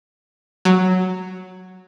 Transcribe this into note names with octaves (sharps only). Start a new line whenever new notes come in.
F#3